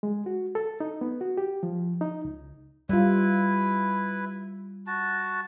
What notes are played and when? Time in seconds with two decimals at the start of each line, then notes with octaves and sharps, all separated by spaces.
0.03 G#3
0.26 F#4
0.55 A4
0.80 D#4
1.01 B3
1.21 F#4
1.37 G4
1.63 F3
2.01 D#4
2.25 C#2
2.89 G3 E4 F4 B4
4.87 F#4 A5